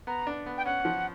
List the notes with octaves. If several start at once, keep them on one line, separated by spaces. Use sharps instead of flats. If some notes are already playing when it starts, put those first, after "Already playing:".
B3 A#5
D4
B3
G5
C#4 F#5
F3